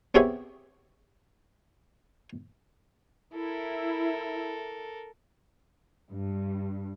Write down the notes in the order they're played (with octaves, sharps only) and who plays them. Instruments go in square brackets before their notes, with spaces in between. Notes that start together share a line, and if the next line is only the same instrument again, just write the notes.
[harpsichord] B3 C4 G4 G#4 C#5 E5
[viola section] E4 [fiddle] A4 A#4
[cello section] G2